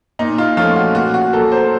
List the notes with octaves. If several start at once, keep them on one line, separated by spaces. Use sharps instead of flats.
A#2 D#4
F4
F3 A3 C#4 F4
F#4
A#2 F#4
F#4
F#3 A#3 A4
C5